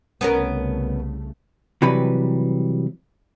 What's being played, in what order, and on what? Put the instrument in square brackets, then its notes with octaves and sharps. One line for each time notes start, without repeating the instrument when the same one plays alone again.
[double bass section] C2 C#3 A3 [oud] B3 C#4 A#4
[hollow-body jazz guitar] C3 E3 F#3 G3 B4 B5